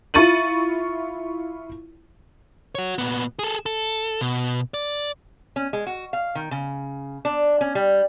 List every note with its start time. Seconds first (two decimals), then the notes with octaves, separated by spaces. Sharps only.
0.14 E4 F4 C#6 A6 D#7 F#7
2.75 F#4 C#5
2.98 A#2 B3
3.39 G#4 A4
3.66 A4
4.21 B2
4.74 D5
5.56 C#4
5.73 G#3
5.87 F#4
6.13 F5
6.35 D#3
6.51 C#3
7.25 D4
7.61 C#4
7.75 G3